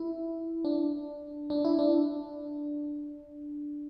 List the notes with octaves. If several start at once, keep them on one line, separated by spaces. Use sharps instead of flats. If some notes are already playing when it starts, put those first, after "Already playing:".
Already playing: E4
D4
D4
E4
D4